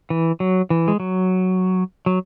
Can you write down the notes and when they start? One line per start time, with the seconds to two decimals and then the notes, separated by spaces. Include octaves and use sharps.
0.10 E3
0.40 F#3
0.70 E3
0.88 G#3
1.00 F#3
2.06 F#3